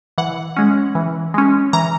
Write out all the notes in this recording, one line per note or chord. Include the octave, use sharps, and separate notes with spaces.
E3 F#5
G#3 C#4
E3
G#3 C#4
E3 A#5